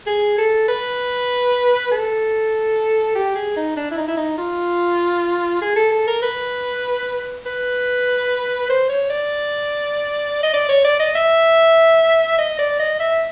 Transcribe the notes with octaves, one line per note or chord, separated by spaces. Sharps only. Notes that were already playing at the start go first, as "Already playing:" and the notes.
G#4
A4
B4
A4
G4
G#4
D#4
D4
E4
D#4
E4
D#4
F4
G#4
A4
A4
A#4
B4
B4
C5
C#5
D5
D#5
D5
C#5
D5
D#5
E5
D#5
D5
D#5
E5